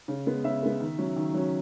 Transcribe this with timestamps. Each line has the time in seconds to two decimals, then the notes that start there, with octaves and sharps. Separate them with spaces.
0.08 C#3
0.26 G#3 B3
0.44 C#3 E5
0.62 G#3 B3
0.80 D#3
0.98 F#3 C#4
1.16 D#3
1.34 F#3 C#4